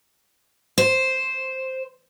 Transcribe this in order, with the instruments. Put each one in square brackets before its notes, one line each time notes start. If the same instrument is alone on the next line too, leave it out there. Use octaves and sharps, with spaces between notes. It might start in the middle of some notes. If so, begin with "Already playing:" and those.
[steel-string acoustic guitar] C5